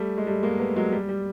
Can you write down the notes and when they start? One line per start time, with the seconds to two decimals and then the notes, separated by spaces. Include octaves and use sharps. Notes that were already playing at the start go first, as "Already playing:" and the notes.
Already playing: G3 A3
0.18 G#3
0.27 G3 A3
0.43 G#3 A#3
0.59 A3 B3
0.76 F#3 G#3
0.92 G3
1.09 G3